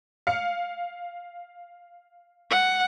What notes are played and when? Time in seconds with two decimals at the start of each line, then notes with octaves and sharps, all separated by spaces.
0.27 F5 C#7
2.51 F#5